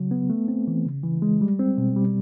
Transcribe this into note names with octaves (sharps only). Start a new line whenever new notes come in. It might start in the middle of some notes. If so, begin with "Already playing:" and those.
Already playing: C#3 F#3
B3
A3
C4
E3
C#3
E3
G#3
G3
C4
B2
G3